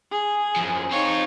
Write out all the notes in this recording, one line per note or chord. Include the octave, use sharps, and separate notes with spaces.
G#4
F#2 F3
C4 D#4 F4 C#5